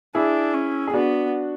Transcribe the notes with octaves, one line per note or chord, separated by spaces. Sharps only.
D4 E4 G#4
C#4
G#4
B3 D4 F#4